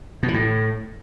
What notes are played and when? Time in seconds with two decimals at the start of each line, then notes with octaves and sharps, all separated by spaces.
0.23 B2
0.28 E3
0.34 A2